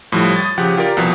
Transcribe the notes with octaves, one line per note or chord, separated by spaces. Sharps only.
A2 F3 G3
D#6 A6
C#3 F3 G4 F#5
F4 G4 A#4 D5
C2 B2 F3